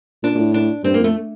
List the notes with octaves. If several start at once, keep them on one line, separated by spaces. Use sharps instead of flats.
A#2 D4
A#2
A2
D4
G2 C4
A#3
F2 A3